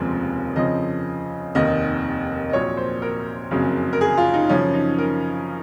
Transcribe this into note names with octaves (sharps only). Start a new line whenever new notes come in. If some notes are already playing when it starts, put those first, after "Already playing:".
Already playing: F1 D#2 C#3 F3 G#3
F2 C#3 F3 C4 D#5
F1 D#2 D#3 D#5
D#5
A#1 A#2 F#3 C#5
C5
A#4
F#1 F2 C#3 F#3
A#4
G#4
F4
D#4
F#2 C#3 F3 C#4
D#4
A#4